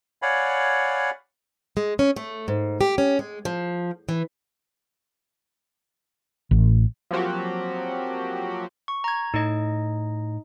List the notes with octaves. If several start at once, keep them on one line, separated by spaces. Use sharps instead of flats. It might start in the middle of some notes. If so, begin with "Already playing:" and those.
C#5 D5 F5 F#5 G#5 B5
G#3
C#4
A3
G#2
G4
C#4
G#3
F3
E3
A1
F3 F#3 A#3 C4 F#4 G4
C#6
A#5 G#6
A2 D#4 D#5